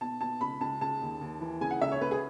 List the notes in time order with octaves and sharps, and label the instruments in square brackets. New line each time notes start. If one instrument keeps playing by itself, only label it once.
[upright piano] B2 A5
B2 A5
C#2 B5
C#2 A5
C#3 A5
D#2
D#2
E3
C#3 G#5
F#5
C#2 E5
C#5
C#2 B4
G#4